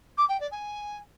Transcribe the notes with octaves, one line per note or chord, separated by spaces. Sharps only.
D6
G5
D5
G#5